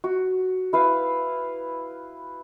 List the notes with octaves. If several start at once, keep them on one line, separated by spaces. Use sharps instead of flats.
F#4
E4 B4 F5